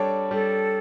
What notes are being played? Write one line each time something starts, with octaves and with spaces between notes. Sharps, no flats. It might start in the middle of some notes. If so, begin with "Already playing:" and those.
Already playing: G3 D4 A4 C#5
G3 A4